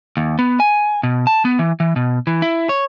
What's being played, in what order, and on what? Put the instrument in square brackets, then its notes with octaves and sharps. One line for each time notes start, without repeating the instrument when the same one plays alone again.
[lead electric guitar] D#2
B3
G#5
B2
A5
B3
E3
E3
B2
E3
E4
C#5